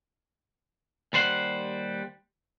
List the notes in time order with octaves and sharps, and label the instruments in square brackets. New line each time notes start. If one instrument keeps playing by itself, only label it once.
[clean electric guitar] D#2 G3 C5 F#5